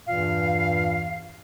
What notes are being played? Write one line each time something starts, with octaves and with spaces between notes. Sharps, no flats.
E2 G2 A#2 E3 F5